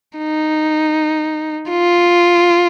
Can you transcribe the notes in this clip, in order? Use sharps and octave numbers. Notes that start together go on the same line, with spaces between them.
D#4
F4